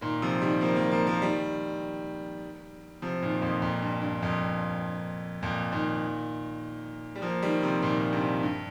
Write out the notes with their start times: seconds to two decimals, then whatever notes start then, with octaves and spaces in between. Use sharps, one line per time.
0.01 A#2 D#3
0.22 C3 F3
0.42 D#3 G3
0.61 F3 A#3
0.76 F3 A#3
0.91 F3 A#3
1.07 F3 A#3
1.22 D#3 G3
3.02 C3 F3
3.22 A#2 D#3
3.42 F2 A#2
3.62 F2 A#2
3.82 G2
4.02 G2
4.22 F2 A#2
5.43 F2 A#2
5.72 A#2 D#3
7.16 G3
7.22 F3 A#3
7.43 D#3 G3
7.63 C3 F3
7.83 A#2 D#3
8.13 G2 C3
8.43 G2